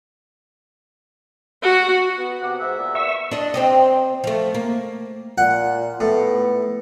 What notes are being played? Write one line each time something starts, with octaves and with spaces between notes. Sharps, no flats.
F#4
B3
C3 B3 F#5 D6
G#2 E5
A#2 B3
E5 C#6 E6
D4 D#5
C4 G4 D#5
F3 A3
A#3
A#2 F#5
A2 B3